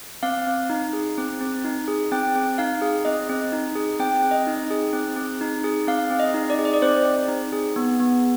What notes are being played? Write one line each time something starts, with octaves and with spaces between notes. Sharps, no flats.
C4 F5
C4
D#4
G#4
C4
C4
D#4
G#4
C4 G5
C4
D#4 F5
G#4
C4 D#5
C4
D#4
G#4
C4 G5
C4
D#5
D#4
G#4
C4
C4
D#4
G#4
C4 F5
C4
D#5
D#4
D5
G#4
D#5
D5
C4 C5
C4
D#4
G#4
B3
B3